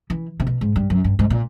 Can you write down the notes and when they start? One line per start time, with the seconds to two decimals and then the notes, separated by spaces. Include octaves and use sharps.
0.10 E3
0.40 C3
0.47 B2
0.61 G#2
0.76 G2
0.90 F#2
1.04 G2
1.19 G#2
1.30 A#2